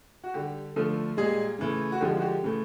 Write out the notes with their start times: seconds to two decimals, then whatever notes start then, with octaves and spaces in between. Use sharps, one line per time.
0.24 F#4
0.34 D3 G3 G4
0.76 D3 F3 A3
1.17 A#2 G3 G#3 G#4
1.59 C#3 E3 A3
1.92 F#4
2.01 D3 F3 G#3 G4
2.17 F#4
2.22 G4
2.42 C#3 E3 A3